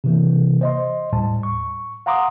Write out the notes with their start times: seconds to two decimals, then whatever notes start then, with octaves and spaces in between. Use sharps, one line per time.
0.04 C3 E3 A#3
0.61 C5 D#5 C6
1.12 D#2 A2 G3 A5
1.43 C#6
2.06 F5 F#5 A#5 C6 D6 D#6